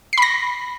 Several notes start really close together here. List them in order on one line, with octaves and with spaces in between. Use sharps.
C7 B5 A#6